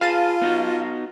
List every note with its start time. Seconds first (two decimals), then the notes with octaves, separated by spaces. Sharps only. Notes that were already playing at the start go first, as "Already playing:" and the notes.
0.01 F4 G#4 B4 F5 A5 D#7
0.42 B3 D#4 F#4